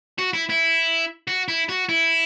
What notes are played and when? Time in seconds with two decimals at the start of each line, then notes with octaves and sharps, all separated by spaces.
0.19 F#4
0.33 E4
0.50 E4
1.28 F#4
1.48 E4
1.69 F#4
1.89 E4